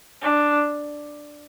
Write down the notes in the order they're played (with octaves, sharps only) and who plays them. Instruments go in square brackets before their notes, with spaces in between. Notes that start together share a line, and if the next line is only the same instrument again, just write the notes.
[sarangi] D4